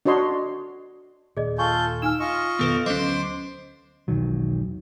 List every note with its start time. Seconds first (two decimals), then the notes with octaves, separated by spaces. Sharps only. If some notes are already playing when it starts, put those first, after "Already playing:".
0.05 D4 F#4 C#5 D#5 C6
1.37 D#2 A#2 G#4 D5 D#5
1.58 F4 A4 G#5 C#6 G6
2.02 D#4 G#5 E6 F6 E7
2.20 F4 D#5 C#6
2.59 F1 B2 D#3 B3 A4 B4
2.86 D2 F#3 C#4 C5 D#5 C6 D6
4.08 E1 B1 D#3 F#3